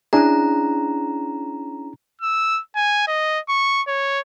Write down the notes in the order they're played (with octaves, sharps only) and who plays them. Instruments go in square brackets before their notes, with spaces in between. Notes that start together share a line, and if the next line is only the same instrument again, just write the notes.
[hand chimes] C#4 A#5 [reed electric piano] D4 E4 G#4
[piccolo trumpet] E6
G#5
D#5
C#6
C#5